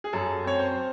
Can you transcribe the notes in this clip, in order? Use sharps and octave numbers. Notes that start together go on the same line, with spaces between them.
G#4
F#2 A4
C4 C#5
C5